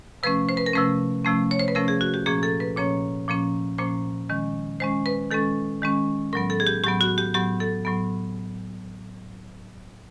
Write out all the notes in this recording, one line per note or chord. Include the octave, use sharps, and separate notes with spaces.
C3 F3 A3 C#4 B4
C5
B4
A#4
C3 F3 A3 C#4 B4
C3 F3 A3 C#4
C#5
C5
B4
C3 F3 A3 C#4 A#4
G#4
F#4
G4
A#2 F3 A#3 C#4 G#4
A4
B4
A#2 F3 A#3 C#4 C#5
A#2 F3 A#3 C#4
A#2 F3 A#3 C#4 C5
D#3 G#3 C#4
D#3 G#3 C#4 C5
B4
D#3 G#3 C#4 A4
D#3 G#3 C#4
A2 F#3 B3 A#4
A4
G#4
G4
A2 F#3 B3 G4
F#4
G4
A2 F#3 B3 G4
A4
A2 F#3 B3